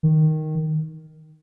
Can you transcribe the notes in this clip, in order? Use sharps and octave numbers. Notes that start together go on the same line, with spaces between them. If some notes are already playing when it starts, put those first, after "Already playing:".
D#3